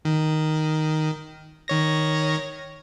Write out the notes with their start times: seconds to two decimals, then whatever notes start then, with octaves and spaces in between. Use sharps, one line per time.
0.05 D#3
1.68 D#3 C#5 A#6